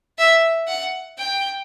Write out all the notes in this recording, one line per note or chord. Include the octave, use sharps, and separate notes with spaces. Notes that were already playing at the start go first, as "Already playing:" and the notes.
E5
F#5
G5